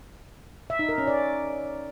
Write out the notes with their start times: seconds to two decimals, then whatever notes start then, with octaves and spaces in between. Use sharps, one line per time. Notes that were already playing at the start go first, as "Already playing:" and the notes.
0.70 E5
0.79 D#4
0.89 A#4
0.98 C#4
1.07 D5